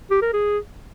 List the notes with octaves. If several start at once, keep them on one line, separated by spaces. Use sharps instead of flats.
G4
A#4
G#4